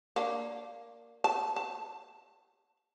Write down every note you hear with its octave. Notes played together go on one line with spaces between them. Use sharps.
A#3 D4
A5
A5